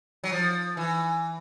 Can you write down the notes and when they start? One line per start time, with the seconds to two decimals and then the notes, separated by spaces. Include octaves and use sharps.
0.24 F#3
0.32 F3
0.77 E3